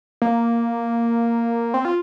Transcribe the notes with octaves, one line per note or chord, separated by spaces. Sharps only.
A#3
C4
F4